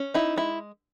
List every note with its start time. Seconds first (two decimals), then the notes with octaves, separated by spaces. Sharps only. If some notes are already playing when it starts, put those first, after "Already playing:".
Already playing: C#4
0.14 D#4 E4
0.36 G#3 E4